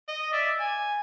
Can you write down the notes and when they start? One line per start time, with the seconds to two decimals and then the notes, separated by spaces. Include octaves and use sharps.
0.08 D#5
0.33 D5 E5
0.60 G#5